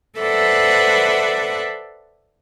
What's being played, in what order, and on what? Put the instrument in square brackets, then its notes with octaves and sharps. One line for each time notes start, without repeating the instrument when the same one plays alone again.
[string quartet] A4 B4 C5 D5 E5 F#5